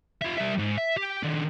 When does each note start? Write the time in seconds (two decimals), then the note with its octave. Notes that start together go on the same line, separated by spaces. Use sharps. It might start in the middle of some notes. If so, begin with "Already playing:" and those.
0.21 F4 E5
0.37 G3 E5
0.58 G#2
0.77 E5
0.97 G4
1.23 D#3 D4